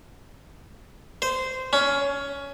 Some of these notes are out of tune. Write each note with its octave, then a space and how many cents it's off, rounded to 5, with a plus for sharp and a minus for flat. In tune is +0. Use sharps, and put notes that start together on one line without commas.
C5 -15
C#4 +15